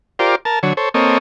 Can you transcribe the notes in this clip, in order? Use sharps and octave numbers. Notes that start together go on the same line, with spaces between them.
F4 G4 A#4 C5 D5
A#4 A5
D3 F#3 C#5
A4 C5 C#5
A#3 C4 A4 C#5 D#5